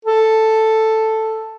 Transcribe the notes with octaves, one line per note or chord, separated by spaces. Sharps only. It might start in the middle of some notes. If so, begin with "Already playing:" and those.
A4